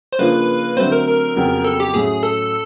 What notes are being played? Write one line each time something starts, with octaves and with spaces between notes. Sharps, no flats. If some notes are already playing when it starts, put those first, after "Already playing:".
C5
C#3 F3 A#3 D4 F4 B4
D3 F#3 A3 C4 C5
A#4
A#4
F2 C#3 F#3 B3
A4
G4
A2 F#3 A3 C#4 G#4
A4